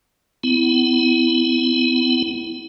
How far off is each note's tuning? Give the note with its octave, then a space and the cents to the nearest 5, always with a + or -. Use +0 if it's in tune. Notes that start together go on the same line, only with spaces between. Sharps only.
B3 +40 E4 +0